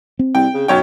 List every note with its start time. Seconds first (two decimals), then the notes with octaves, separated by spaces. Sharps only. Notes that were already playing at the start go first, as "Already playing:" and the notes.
0.19 C4
0.35 C2 G5
0.54 C#3
0.68 B1 F#2 C#5 G5